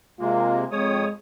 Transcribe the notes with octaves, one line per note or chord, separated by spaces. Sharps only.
C3 G#3 A#3 F4
F2 G#3 C#5 D#6